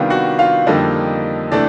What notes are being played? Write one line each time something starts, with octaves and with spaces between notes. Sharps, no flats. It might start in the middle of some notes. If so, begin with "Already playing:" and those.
Already playing: C3 D#3 G3 B3 D4 F4 F5
F#4 F#5
F4 F5
F2 D3 G3 A#3 D#4 D#5
C3 E3 A3 D4 D5